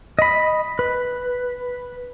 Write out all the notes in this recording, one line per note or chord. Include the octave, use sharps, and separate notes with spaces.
D#5 B5
B4